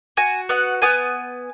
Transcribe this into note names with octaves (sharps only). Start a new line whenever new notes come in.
F#4 G#5
B3 F#5
B3 G#5